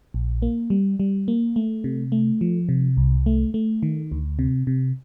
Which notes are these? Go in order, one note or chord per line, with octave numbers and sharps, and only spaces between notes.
A#1
A#3
G3
G3
A#3
A3
C3
A3
F3
C3
C2
A3
A3
D#3
D2
C3
C3